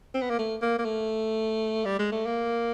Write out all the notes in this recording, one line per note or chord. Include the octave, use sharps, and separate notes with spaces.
C4
B3
A#3
A3
A#3
A#3
A3
G3
G#3
A3
A#3